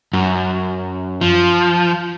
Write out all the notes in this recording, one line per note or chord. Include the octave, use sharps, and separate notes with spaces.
F#2
F3